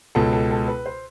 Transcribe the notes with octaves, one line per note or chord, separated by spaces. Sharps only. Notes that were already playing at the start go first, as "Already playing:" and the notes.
C#2 B2 A4
A4
A4
B4
C5